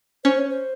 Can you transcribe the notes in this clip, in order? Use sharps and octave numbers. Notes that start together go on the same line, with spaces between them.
C#4 C5
C#5
C5